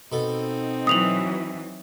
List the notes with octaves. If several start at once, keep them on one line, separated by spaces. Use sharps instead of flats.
B2 C4 D#4 A4
E3 F#3 D#6 F7 F#7